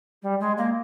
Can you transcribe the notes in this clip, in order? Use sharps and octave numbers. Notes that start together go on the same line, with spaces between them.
G3
G#3
A#3